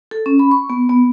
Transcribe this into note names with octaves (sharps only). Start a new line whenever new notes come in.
A4
C#4
B5
C#6
B3
B3